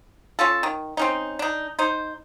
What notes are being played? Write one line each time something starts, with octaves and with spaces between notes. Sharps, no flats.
C#4 F4 A4
D#3
C4 C#4 D#4
D4 D#4
D#4 C5